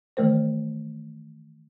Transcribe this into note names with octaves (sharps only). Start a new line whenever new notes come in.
D#3 E3 A3 A#4 C5